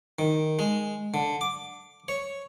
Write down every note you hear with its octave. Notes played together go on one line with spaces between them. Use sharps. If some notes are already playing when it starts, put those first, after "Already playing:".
D#3
G#3
D3
D6
C#5